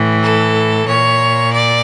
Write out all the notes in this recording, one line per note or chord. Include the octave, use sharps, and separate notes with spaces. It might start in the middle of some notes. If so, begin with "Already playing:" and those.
Already playing: A2 E3
A4
A#2 C#5
D5